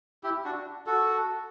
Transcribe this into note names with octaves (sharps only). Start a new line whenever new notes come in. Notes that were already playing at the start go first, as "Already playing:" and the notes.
E4 G4
D4 F#4
F#4 A4